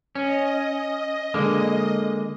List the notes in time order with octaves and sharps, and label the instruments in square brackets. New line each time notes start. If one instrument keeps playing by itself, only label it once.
[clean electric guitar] C#4 [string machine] D#5
[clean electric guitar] D3 G#3 A#3